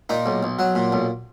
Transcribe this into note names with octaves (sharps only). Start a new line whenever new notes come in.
A#2 D#4
B1
B1
F#3
A#2
B1